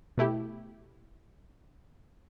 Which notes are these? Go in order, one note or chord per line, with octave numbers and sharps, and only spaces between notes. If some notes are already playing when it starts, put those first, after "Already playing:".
B2 A3 E4 G4